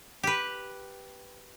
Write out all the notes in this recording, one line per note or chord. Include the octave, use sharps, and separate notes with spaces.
G4 B4